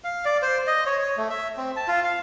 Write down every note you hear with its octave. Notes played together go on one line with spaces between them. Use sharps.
F5
D5
C5
D#5
C#5
C#5
A3
E5
C4
A5
F4
F5